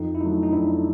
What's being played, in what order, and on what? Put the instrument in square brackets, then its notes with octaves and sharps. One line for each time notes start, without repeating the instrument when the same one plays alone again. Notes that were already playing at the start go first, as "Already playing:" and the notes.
Already playing: [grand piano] F2 [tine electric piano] D#4
[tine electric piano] E4
[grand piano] D3 F#3 A3 [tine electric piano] D#4
[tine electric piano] D#4
[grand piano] F2 [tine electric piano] D4 E4